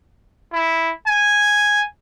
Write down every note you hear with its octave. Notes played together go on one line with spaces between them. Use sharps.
E4
G#5